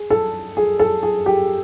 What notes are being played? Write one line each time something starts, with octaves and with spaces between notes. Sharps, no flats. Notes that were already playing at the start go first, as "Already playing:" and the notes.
Already playing: G#4
A4
G#4
A4
G#4
G4